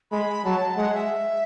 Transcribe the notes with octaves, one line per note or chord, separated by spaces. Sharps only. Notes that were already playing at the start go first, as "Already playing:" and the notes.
G#3 B5
F#3 A5
A5
G#3 F#5
E5